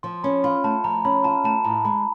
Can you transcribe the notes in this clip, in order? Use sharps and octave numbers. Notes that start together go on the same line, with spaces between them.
F3 C6
C#4 B5
F4 B5
A3 A5
F3 A#5
C#4 B5
F4 A5
A3 A5
A2 A#5
G#3 B5